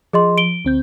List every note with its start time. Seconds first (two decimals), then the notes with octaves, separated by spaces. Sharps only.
0.13 F3 G#4 D#5 C6
0.38 D7 G7
0.65 D2 C4 G6